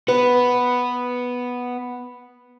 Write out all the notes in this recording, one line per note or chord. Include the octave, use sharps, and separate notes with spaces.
B3 B4